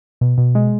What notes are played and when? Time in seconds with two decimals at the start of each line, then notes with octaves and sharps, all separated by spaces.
0.21 B2
0.38 B2
0.55 G#3